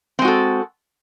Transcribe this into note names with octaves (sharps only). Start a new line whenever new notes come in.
G#3 C4 F#4 A4